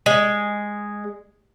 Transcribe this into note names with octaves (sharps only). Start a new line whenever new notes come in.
G#3